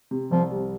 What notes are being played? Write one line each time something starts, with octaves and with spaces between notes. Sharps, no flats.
C3
C2 F3
G3